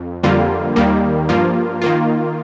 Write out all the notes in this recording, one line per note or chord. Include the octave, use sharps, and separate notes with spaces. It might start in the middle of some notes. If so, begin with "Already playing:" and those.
Already playing: F2
F2 D3 G3 A#3 F4
D#2 D#3 G3 A#3
G2 F3 A#3 F4
D#3 A#3 F4